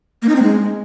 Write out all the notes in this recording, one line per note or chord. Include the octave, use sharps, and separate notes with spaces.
A#3
D#4
C4
G#3